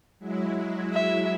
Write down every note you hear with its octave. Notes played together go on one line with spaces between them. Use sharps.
F#3 G#3 E4
E5